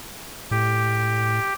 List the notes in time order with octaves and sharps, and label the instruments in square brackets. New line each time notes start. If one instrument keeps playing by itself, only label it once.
[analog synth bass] A2 [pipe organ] G4